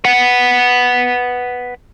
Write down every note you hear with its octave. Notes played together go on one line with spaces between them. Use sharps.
B4 F#5